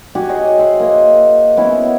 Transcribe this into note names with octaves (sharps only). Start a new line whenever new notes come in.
F#4 G4 F#5 G#5
G#4 C#5 D#5 G5
C5 E5 F#5 C6
A#3 D#5
B3 C#4 E4